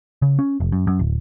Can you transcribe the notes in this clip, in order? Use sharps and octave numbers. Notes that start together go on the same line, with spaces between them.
C#3
C#4
F1
F#2
F#2
D1